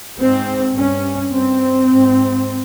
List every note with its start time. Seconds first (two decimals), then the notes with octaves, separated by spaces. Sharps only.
0.20 G#2 C4
0.77 G2 C#4
1.33 G2 C4
1.91 G#2